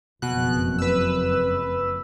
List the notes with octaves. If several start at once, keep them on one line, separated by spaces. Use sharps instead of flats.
F#1 F2 B2 F#6
B4 E6